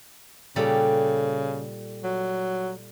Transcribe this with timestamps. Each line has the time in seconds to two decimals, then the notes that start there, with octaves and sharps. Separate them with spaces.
0.56 A#2 C#3 G3 A4
2.04 F#3